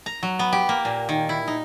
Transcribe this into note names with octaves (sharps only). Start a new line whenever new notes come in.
A#5
F#3
B3
G4
A#3
A#2
D#3
E4
D#4